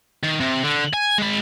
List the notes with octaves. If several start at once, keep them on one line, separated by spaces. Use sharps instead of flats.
D#3
C3
D3
G#5
G#3 B5